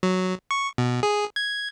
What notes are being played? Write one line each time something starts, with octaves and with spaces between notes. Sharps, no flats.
F#3
C#6
B2
G#4
G#6